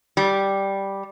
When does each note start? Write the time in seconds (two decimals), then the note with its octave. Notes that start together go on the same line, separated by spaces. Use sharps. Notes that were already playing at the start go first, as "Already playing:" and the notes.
0.17 G3